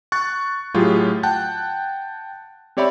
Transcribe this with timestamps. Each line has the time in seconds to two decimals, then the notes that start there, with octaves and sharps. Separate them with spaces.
0.12 C#6 F#6 A6
0.74 A2 F#3 F4 G4 G#4
1.23 F#5 G5 A5 F#6
2.77 C4 G4 C#5 D5 E5 B5